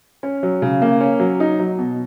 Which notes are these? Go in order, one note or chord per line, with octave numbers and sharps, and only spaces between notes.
C#4
F#3
C#3
A#3
C#4
F#3
D#4
F#3
B2